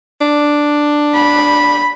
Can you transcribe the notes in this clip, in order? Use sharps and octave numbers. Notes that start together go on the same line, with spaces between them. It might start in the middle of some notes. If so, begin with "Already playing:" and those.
D4
B5